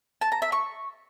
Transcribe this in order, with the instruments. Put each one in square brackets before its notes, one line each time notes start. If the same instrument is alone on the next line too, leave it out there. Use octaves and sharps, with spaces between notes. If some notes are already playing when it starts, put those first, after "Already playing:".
[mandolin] A5
A#5
E5
C#6